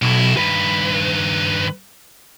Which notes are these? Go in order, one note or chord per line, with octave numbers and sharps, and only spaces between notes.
B1 B2 E4
G2 D#3 B4